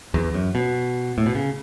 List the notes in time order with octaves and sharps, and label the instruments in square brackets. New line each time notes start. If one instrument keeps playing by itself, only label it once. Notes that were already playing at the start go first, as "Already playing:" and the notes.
[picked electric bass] E2
F#2
B2
A2
B2
C#3